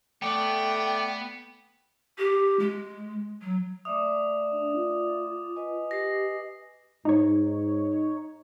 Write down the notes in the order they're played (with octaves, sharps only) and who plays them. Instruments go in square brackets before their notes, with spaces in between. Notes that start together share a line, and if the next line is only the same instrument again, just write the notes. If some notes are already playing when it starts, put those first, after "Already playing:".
[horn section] A3 D5 [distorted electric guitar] B3 [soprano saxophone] G5
[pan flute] G4
G#3
F#3
[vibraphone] A3 D5 E5 [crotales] D6 D#6
[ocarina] D4
F4
[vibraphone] B4 D#5 G#5
[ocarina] G4 [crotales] A#6 C7
[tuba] G#2 [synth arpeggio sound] D#4 C#5